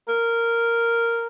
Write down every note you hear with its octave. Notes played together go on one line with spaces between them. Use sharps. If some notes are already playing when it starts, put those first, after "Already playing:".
A#4